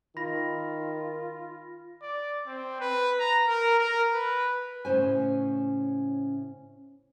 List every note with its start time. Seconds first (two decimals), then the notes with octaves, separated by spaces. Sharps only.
0.17 D#3 F4 B5 A#6
2.02 D5
2.47 C4
2.81 B4
3.20 A#5
3.48 A#4
3.79 A#4
4.13 B4
4.85 A2 C#3 C#4 C5 G#5